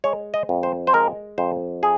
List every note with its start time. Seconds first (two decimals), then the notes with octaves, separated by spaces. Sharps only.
0.04 G#3 C#5
0.34 D#5
0.49 F2
0.63 C5
0.87 C5
0.93 G#3 A#4
1.38 F2 C5
1.83 G#4